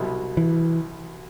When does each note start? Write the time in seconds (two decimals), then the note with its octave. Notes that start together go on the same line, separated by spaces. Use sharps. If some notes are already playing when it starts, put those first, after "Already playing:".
Already playing: C2 B2 F#3
0.37 E3